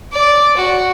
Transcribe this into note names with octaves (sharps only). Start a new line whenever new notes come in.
D5
F#4